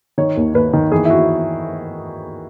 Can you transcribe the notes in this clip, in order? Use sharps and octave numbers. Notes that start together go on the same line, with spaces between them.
D#3 C#5
D#2
D#2 B4
D#3
E3 G#4
E4
F#4